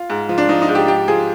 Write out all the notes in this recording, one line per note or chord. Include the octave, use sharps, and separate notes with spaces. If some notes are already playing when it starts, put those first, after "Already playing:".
Already playing: F4
G#2
F3
D4
F3 D#4
D#4
G#2
G4
G#2 G4
F3 G#4